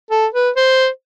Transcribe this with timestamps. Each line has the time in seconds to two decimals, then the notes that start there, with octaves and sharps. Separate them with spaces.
0.11 A4
0.34 B4
0.56 C5